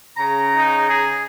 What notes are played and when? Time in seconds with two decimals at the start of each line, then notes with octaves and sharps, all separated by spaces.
0.17 C#3 A#5
0.56 D#4
0.89 G#4